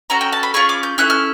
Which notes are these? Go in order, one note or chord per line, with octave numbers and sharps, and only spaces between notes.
C#4 F#4 A4 A#5
G5
A5
B5
C#4 F4 G#4 C#6
D6
G6
C#4 E4 A4 F#6
F6